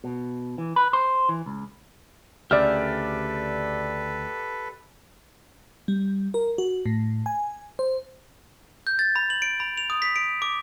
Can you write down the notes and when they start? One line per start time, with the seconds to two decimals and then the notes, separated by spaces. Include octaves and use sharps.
0.04 B2
0.58 E3
0.76 B4
0.93 C5
1.29 E3
1.46 C#2
2.51 D2 C#3 G4 A4 B4 D5 E5 F6
5.88 G3
6.34 A#4
6.58 F#4
6.86 A2
7.26 G#5
7.79 C5
8.87 G6
8.99 A6
9.16 B5
9.30 F#7
9.42 D7
9.60 B5
9.78 F7
9.90 D#6
10.02 B6
10.16 D7
10.42 D6